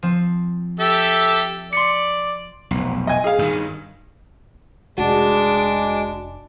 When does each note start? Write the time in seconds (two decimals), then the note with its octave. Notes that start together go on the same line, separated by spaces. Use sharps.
0.03 F3 C4
0.80 G4 A4 E5
1.73 D5 C6 B6 C#7
2.71 F1 B1
3.07 D#5 G#5
3.24 G#4 F5
3.39 G2 D#3
4.98 F1 G#3 D4 F#4 D6